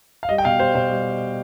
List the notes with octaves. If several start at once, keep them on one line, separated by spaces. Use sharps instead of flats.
F5
G3 D#5
G5
B2 F5
G3 C5
B2 C5
G3